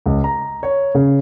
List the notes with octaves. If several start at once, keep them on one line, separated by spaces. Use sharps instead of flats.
C#2
A#5
C#5
C#3